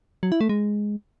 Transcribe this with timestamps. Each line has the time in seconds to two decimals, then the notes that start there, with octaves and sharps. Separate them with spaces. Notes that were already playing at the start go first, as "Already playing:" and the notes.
0.23 F#3
0.32 E4
0.41 A3
0.49 G#3